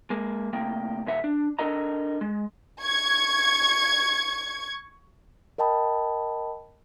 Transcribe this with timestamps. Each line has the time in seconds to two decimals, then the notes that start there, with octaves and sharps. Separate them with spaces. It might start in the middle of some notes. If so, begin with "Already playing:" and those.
0.10 G#3 A#3
0.53 C3 A3 A#3 G5
1.06 D#2 A#2 E5 F#5
1.24 D4
1.59 D4 A4 A#4 D#5 A#5
2.21 G#3
2.82 C#6 G#6
5.58 A#4 D#5 G5 A5 B5 D#6